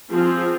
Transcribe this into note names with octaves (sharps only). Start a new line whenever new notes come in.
F3 C4 F4 G#4